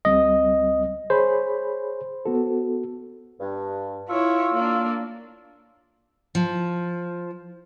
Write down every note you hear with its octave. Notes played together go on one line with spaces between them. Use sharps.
C#2 G3 C4 D#5
G#4 C5 C#5 B5
B3 F#4 A4
G2
E4 F4 C#5 E6
A#3 D4
F3